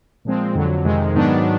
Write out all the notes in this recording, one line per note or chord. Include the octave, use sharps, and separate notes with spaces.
A#2 F3 G#3 C4
F2 D3 F#3
F2 C3 D#3 G#3
G#2 D#3 F#3 B3 D4